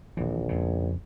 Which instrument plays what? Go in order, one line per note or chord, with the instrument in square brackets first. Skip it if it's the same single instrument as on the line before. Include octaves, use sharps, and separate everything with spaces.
[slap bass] D#1 E3 [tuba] A#1
[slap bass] F2 C#3